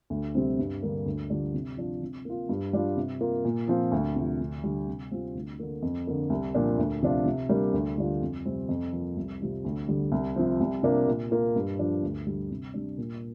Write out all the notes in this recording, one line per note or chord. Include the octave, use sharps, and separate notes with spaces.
D2
C3 G3 C4
G2
D3 G3 A#3
D2
D3 G3 D4 F4
C3
F3 D4 F4
C3
A#3 F4
G2
G3 D4 F4
C3
A#3 F4
A#2
F3 C4 F4
D2
C3 F3
D2
D3 G3
C3
G3 C4 F4
D2
D3 A#3
F2
D3 A#3
C2
A#2 F3 D4 F4
D2
C3 F3 D4 F4
C3
G3 A#3 D4
D2
D3 G3 D4 F4
F2
C3 G3 C4
F2
F3 A#3 F4
C2
C3 G3 C4 F4
D2
D3 G3
C2
C3 F3 C4
C2
C3 A#3 D4 F4
A#2
A#3 F4
G2
F3 D4
D2
D3 G3
C3
G3 D4
A#2